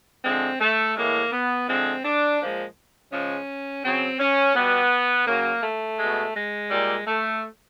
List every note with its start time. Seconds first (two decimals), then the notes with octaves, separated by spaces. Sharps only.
0.25 D3 F3 G#3 C4
0.60 A3
0.97 A2 E3 G#3 A#3
1.32 B3
1.68 D3 F3 G#3 C4
2.05 D4
2.40 A#2 F3 G#3
3.12 C#3 F3 G#3 C#4
3.84 C#3 F#3 C4
4.20 C#4
4.55 B2 G3 B3
5.27 C#3 F#3 A#3
5.63 A3
5.99 B2 G#3
6.35 G#3
6.71 A#2 G3
7.07 A3